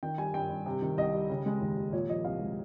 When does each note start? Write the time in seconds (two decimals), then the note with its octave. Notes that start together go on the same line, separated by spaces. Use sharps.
0.03 D#3 G5
0.18 G3 G#5
0.34 G2 G5
0.50 G2
0.66 C3
0.82 D#3
0.98 C2 D#5
1.14 G3
1.30 C#3
1.46 G#3
1.61 D#2
1.77 D#2
1.93 A#2 C#5
2.09 F3 D#5
2.25 C2 F5
2.41 G#3